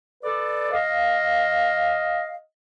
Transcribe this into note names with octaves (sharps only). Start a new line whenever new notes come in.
A4 B4 D5
D#5 F5